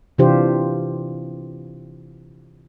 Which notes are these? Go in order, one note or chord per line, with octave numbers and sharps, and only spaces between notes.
C3 E3 D4 F4 G4 C5